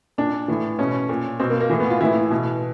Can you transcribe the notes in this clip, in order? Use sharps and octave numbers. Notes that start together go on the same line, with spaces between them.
A#2 D4
A2 E3
B2 C#4
A#2
B2 C4
A#3
A#3
A2 E3
B3
F4
A2 E3 E4
B2